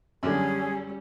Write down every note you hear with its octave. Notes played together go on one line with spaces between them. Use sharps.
F#2 D3 G3 C#4 G#4